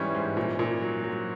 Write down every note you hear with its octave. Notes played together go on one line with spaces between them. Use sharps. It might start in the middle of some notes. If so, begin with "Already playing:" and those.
Already playing: G#2 E3 G3 C#4
G#2
A#2
A#2
F#3
F#3